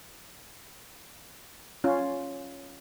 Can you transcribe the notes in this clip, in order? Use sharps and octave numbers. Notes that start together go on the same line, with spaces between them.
C#4 F4